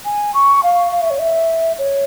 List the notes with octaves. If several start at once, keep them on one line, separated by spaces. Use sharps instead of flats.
G#5
C#6
F5
F5
E5
C#5
E5
C#5